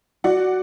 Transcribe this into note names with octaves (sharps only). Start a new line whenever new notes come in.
F#4 D5 F#5